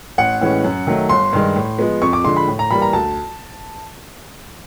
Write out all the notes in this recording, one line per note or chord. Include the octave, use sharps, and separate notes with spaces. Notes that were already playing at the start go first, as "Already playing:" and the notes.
A1 F#5
A2 E3 G#3 C#4
F#2
D#3 F#3 A3
G1 C6
G2 D#3 G#3
A2
F3 G#3 B3
F2 C#6
D6
D3 F3 G#3 C6
B5
A2
A#5
E3 G3 A#3 B5
A#5
D2 A5